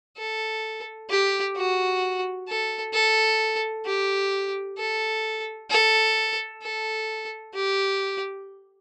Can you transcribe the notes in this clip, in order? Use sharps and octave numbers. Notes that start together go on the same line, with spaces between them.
A4
G4
F#4
A4
A4
G4
A4
A4
A4
G4